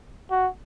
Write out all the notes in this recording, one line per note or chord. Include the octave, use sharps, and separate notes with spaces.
F#4